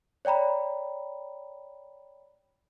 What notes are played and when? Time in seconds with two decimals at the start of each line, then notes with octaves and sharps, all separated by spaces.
0.25 C#5 D5 G5 A#5 B5